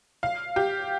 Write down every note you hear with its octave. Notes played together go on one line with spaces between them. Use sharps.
F5
G4